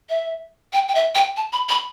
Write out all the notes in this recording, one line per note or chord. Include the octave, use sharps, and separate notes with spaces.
E5
G5
G5
E5
G5
A5
B5
B5